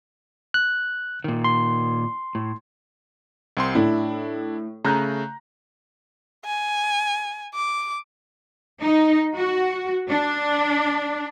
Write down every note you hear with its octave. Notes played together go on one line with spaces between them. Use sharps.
F#6
A#2 D#3
C6
A2
C2 C4 C6
A2 D4 E4
C#3 A3 A#5 F#6 G6
G#5
D6
D#4
F#4
D4